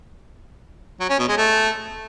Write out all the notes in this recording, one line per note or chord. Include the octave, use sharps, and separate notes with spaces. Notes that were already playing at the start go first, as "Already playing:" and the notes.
F#3
C#4
B2
G#3
A3